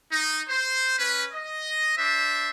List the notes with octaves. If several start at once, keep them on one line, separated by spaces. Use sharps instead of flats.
D#4
C5
C#4 B4
D#5
D4 C5 E5